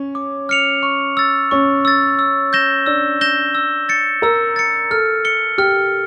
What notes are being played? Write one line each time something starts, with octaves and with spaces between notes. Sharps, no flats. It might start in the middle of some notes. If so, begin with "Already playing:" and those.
Already playing: C#4
D6
F6 C#7 F7
C#6
E6 A6
C#4 C#6
E6 A6
E6
G6 A#6 E7 G7
D4 E6
G6 A#6 E7 G7
E6
A6 C#7
A#4 E6
A6 C#7
A4 F6
C#7 G7
G4 F6